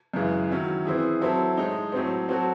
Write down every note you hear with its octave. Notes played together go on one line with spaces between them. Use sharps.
F#2 C#3 E3 G#3
D#3 F#3 C#4 E4
E3 C4 E4 G#4
F#3 C4 E4 A4
A2 G#3 D#4
A2 F#3 C4
F#3 C4 F#4 A4